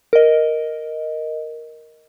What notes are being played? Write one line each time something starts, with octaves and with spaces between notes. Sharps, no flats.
A#4 D#5